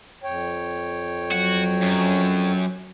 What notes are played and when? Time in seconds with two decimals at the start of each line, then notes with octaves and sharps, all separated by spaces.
0.23 F2 C#5 G5
1.32 F#3 F#4
1.82 F#2